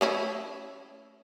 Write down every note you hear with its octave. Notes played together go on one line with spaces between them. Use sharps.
A3 C#4 E4